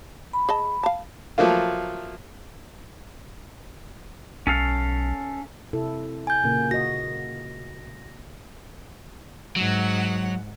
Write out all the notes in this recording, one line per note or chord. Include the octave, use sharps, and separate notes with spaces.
B5
G#4 D#5 A5
F5 A5
F3 F#3 A3 A#3 F4
B1 C#4 A4 F5
C3 E4 A4
G#5 G6
A#2 C#3 A#3
F#4 D#5 A#6
G#2 F#3 F#5